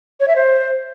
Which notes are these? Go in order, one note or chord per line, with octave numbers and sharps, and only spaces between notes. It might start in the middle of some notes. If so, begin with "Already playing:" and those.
C#5
E5
C5